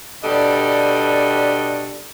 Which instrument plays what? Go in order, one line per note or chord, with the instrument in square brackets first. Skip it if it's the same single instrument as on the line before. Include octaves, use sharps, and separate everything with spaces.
[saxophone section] B2 G3 D4 A4 D#5